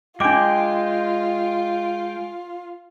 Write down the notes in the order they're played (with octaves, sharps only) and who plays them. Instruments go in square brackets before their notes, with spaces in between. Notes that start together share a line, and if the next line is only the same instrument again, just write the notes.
[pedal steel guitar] G#3 G5 [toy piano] D4 D6 [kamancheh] F4